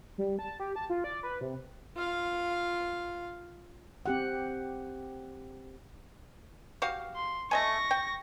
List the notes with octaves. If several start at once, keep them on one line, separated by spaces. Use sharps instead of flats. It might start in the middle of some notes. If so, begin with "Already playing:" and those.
G3
A5
G4
A5
F4
D5
B4
C3
F4 F5
C4 G4 F#5
F#4 G4 F5
C6
A3 D#5 G#5 C#6 A#6
G5